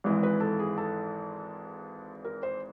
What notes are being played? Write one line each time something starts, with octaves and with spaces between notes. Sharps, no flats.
G#1 G#2 E3 G#3
B4
A4
G#4
A4
A#4
C5